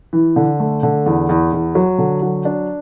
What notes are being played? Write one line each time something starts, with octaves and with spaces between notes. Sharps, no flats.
E3
D3
A3
D3
E2
E2
E2
F#3
D3
F#3
D4